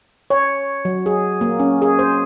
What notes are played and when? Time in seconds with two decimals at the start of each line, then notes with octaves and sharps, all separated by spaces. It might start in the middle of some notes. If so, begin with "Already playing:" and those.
0.30 C#5
0.85 F#3
1.06 G#4
1.41 A#3
1.59 C#4
1.82 G#4
1.99 C5